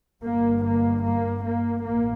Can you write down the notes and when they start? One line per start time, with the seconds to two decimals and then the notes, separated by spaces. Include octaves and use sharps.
0.23 G1 G2 A#3
0.64 A#3
1.03 A#3
1.45 A#3
1.84 A1 A2 A#3